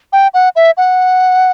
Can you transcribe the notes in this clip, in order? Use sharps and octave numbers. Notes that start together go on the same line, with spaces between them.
G5
F#5
E5
F#5